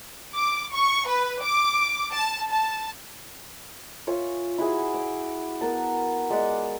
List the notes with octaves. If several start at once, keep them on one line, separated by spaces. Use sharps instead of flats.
D6
C#6
B4
D6
A5
A5
F4 C#5 E5 G#5
E4 F#4 G#4 E5
D6
B3 A#4 A5
G#3 D5 E5 F#5